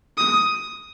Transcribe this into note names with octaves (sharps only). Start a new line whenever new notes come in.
D#6